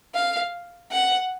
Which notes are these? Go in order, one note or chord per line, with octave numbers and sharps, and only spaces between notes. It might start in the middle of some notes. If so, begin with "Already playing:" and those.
F5
F#5